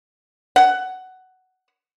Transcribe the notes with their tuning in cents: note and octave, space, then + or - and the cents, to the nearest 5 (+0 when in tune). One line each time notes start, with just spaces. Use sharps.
F#5 +10